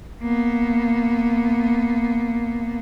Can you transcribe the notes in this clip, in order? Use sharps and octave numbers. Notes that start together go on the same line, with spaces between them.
A#3 B3